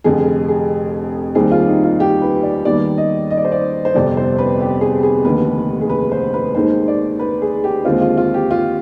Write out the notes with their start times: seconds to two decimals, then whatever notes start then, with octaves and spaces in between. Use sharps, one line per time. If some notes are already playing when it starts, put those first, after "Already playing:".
0.04 F1 F2 D3 G#4
0.48 G#4
1.35 D#2 D#3 G3 C4 G#4
1.51 F4
1.68 D#4
1.84 F4
2.00 G4
2.22 B4
2.43 D5
2.65 D#2 D#3 G3 B3 D5
2.98 D#5
3.31 D#5
3.37 D5
3.45 C5
3.52 D5
3.85 C5
3.95 G1 F2 C3 D5
4.17 C5
4.38 B4
4.60 G4
4.81 G#4
5.03 G#4
5.25 F1 D#2 D3 B4
5.81 G#4
5.89 B4
6.12 C5
6.34 B4
6.55 D#2 D#3 G#3 C5
6.88 D5
7.19 B4
7.42 G#4
7.64 G4
7.85 D#2 D3 G#3 C4 F4
8.01 F4
8.17 F4
8.34 G4
8.51 F4